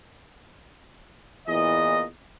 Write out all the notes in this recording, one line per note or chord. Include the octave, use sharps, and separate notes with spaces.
E2 A#2 E3 D#5